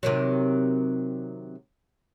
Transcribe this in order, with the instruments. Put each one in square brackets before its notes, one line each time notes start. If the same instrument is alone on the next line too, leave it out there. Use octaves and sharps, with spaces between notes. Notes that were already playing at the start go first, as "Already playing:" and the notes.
[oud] C3 D#3 F#3